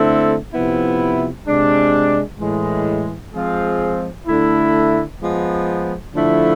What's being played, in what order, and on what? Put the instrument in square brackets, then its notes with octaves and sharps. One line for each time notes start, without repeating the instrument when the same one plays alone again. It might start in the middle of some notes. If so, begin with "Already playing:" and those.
Already playing: [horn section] D3 A3 C4 E4 A4
C3 F3 B3 E4
C3 G#3 D4
A2 E3 G#3
F3 G#3 C4 F4 G#4
D3 A3 E4
F3 G#3 B3
D3 F3 A3 E4